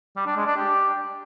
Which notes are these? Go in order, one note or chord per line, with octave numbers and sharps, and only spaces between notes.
G3
D4
G#3
D4
G4